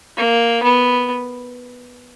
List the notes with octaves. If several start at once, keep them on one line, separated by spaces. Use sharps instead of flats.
A#3
B3